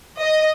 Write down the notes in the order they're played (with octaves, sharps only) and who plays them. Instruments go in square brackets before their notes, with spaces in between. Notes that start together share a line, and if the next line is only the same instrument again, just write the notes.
[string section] D#5